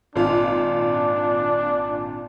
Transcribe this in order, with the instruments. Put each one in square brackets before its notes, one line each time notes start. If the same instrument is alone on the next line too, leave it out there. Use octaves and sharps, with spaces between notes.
[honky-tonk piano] G#1 A#2 F4 [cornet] D4